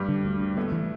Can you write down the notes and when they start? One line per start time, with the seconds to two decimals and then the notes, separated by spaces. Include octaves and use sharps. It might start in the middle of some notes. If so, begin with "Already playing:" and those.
Already playing: G2 G3
0.08 D3
0.25 D2
0.40 D2
0.57 A2 A3 B3
0.72 E3